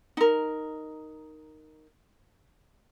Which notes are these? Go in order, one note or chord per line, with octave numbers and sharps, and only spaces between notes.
D#4 A#4